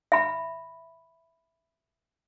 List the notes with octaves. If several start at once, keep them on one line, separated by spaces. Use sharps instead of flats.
E5 B5